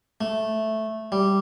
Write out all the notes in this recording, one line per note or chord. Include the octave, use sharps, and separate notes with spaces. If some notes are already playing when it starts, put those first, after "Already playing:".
A3
G3